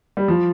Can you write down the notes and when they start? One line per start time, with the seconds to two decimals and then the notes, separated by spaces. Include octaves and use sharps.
0.17 G3
0.28 F3